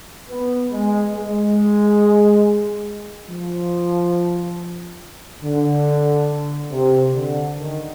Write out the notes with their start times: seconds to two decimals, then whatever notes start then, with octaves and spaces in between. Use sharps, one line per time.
0.29 B3
0.72 G#3
1.16 G#3
3.29 F3
5.44 D3
6.71 C3
7.14 D3
7.58 D#3